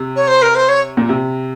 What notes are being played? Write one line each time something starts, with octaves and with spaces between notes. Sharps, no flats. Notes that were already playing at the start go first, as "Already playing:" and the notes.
Already playing: C3
C#5
C5
A#4
C5
C#5
A#2
C3